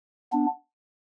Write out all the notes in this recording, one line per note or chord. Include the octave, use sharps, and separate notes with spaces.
B3 D4